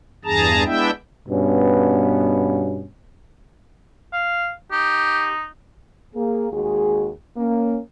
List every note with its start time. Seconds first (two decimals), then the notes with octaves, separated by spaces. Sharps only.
0.25 E2 G2 G#4 A5 A#5
0.65 G#3 B3 D4 E4 E5 G5
1.29 G2 B2 B3 C#4
4.13 F5
4.72 D#4 G4
6.15 A#3 G#4
6.52 D#2 G#3 F#4 G#4
7.37 A#3 C#4